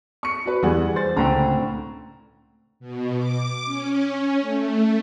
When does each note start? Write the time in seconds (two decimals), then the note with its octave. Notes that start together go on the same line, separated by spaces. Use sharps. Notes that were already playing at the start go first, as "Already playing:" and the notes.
0.23 C#6 C#7
0.46 F#4 B4
0.63 E2 G3 G#4 F#5
0.96 C5 A6
1.17 C#2 A2 D3 C4 A#5
2.80 B2
3.17 D6
3.65 C#4
4.41 A3